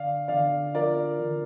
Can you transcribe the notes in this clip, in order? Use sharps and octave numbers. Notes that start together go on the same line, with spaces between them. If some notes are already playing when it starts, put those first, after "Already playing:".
Already playing: D3 D5 F5
D3 D5 F5
F3 A#4 D5
D3